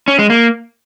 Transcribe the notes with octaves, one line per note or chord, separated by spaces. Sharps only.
C#4
G#3
A#3